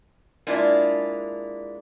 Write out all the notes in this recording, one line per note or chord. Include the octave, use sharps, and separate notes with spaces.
G#3 A#3 D4 E4 F4